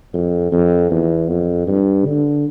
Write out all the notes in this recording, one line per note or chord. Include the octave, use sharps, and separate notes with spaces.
F2
F2
E2
F2
G2
D3